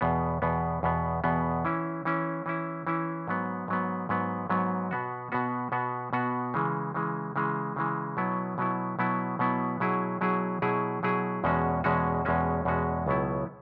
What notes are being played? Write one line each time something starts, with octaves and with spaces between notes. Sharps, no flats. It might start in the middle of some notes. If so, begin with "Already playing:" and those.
E2 B2 B3
E2 B2 B3
E2 B2 B3
E2 B2 B3
E3 C#4 E4
E3 C#4 E4
E3 C#4 E4
E3 C#4 E4
G#2 F#3 B3
G#2 F#3 B3
G#2 F#3 B3
G#2 F#3 B3
B2 B3 F#4
B2 B3 F#4
B2 B3 F#4
B2 B3 F#4
C#3 E3 G#3
C#3 E3 G#3
C#3 E3 G#3
C#3 E3 G#3
B2 F#3 B3 E4
B2 F#3 B3 E4
B2 F#3 B3 E4
B2 F#3 B3 E4
B2 F#3 E4 G#4
B2 F#3 E4 G#4
B2 F#3 E4 G#4
B2 F#3 E4 G#4
E2 B2 G#3 C#4 F#4
E2 B2 G#3 C#4 F#4
E2 B2 G#3 C#4 F#4
E2 B2 G#3 C#4 F#4
C#2 B2 F#3 B3 E4